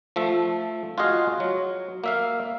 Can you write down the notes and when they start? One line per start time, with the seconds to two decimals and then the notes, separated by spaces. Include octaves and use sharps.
0.16 F3 A3 E5
0.98 F4 F#4 G#4 D#5 F5
1.40 F#3
2.04 A#3 E5 F5